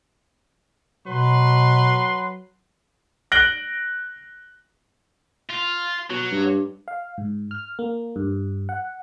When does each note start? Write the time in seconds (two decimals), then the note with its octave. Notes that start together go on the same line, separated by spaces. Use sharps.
1.07 B2 F#3 B4 C6
3.32 F#6 A#6 D7 F#7 G7
5.50 F4
6.10 B2 F#3
6.31 G2
6.88 F5
7.18 G#2
7.51 F6
7.79 A#3
8.16 G2
8.69 F#5